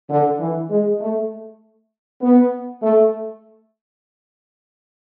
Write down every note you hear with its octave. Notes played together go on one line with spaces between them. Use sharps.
D3
E3
G#3
A3
B3
A3